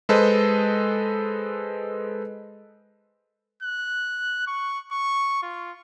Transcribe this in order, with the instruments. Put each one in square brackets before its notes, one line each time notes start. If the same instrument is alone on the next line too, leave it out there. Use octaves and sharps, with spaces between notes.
[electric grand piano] G#3 A4 B4 C5 D#5
[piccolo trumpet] F#6
C#6
C#6
F4